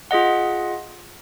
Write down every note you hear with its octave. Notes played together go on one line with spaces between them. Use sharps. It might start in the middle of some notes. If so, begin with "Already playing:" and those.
F4 G#4 D#5 F#5